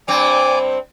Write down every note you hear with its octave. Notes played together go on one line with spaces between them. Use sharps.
G2 C4 D5 G#5 D6